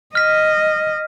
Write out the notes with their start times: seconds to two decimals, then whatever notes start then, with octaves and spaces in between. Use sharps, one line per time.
0.15 D#5 F6 B6